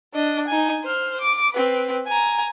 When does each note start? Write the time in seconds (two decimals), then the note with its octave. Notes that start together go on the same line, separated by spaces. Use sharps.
0.15 D4 D#5
0.47 D#4 G#5
0.84 C5 F6
1.21 D6
1.54 C4 B4
2.08 G#5 A#5